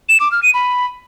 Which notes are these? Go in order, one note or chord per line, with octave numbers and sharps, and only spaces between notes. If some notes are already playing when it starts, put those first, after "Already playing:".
E7
D6
F6
D#7
B5